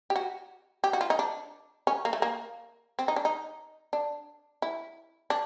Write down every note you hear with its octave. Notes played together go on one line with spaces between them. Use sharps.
G4
F#4
G4
F#4
F4
D#4
D4
C#4
A#3
A3
A#3
C4
D#4
D4
D#4
D4
E4
D4